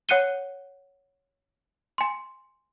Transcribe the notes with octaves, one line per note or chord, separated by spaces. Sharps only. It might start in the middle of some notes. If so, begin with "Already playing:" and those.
C#5 F#5 F#6 C#7 D#7 G7
G#5 C6